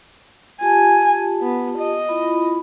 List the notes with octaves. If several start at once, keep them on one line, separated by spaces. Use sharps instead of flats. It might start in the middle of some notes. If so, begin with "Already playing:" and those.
F4 G4 G#5 A5
B3
D#5
E4 F4 B5